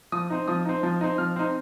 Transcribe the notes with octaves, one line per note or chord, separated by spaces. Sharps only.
F3 D#6
C4 D#4
F3 D#6
C4 D#4
F3
C4 D#4
F3 F6
C4 D#4